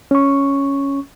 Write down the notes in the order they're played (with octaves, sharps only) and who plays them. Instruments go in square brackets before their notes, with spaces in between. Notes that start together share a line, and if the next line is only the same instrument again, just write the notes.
[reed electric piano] C#4 C#6